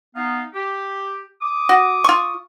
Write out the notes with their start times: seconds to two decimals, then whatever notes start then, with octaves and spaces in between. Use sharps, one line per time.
0.16 B3 D#4 F5
0.54 G4
1.42 D6 D#6
1.69 F#4
2.04 F4 C#6